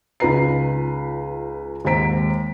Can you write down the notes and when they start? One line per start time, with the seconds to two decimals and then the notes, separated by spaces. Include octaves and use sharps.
0.20 C#2 D#4 F4 B4 A#5 C7
1.85 D#2 G#2 C4 A#5 B6 D7